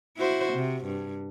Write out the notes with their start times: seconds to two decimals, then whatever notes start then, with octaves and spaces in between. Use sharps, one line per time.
0.18 E4 F#4 C5
0.53 C3
0.85 G2